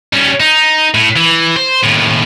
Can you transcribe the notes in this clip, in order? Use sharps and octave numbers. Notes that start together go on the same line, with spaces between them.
G3 C#4
D#4
A2
E3
C5
D#2 A2